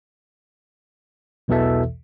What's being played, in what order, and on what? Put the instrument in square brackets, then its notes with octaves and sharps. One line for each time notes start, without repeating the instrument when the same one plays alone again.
[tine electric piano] B1 E2 B2 E3 A4 E5